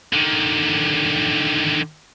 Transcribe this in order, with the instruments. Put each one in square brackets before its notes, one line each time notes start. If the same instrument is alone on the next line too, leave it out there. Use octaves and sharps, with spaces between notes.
[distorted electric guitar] D3 D#3